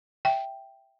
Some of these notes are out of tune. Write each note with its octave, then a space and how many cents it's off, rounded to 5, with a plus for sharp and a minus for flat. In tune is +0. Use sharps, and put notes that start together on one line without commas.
E5 +0 G5 +0